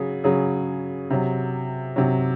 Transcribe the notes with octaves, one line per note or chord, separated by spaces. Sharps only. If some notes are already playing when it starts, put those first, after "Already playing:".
Already playing: C#3 F#3 G#4
C#3 F#3 G#4
C3 F#3
C3 F#3